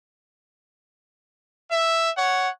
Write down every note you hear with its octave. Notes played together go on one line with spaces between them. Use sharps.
E5
C#5 F#5